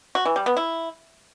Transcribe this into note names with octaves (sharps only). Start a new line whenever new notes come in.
F#4
E3
G3
B3
E4